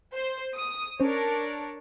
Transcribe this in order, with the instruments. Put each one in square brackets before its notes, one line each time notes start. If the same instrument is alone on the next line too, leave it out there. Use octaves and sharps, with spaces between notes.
[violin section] C5
D#6
[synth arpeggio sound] C#4 C5 [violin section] D4 A#4 C#5